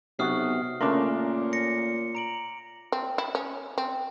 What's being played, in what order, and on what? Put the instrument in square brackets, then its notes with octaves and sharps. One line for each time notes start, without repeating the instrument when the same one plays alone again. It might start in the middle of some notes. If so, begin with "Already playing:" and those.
[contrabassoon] B1 [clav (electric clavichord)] C3 F#4 [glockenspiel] D#6 F6 C7
[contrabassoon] A#2 [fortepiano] C#3 D4 A#4 [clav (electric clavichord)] A3 C#4 [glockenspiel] C6 D6
[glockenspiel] A#6 C#7
A#5 D7 F#7
[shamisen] C4
E4
C#4
C4